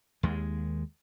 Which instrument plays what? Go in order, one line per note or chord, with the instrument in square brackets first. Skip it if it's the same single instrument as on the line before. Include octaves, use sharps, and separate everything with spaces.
[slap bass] D#2 G#3